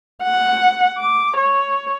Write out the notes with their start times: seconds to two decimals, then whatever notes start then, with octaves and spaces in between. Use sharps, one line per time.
0.23 F#5
0.97 D6
1.37 C#5